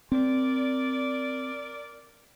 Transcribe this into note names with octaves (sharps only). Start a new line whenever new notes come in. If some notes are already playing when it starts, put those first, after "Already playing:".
C4 A#4 D5